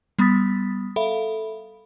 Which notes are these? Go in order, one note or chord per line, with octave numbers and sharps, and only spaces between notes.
G3 B3 B5 D#6 A6 B6
A4 E5 F5 B5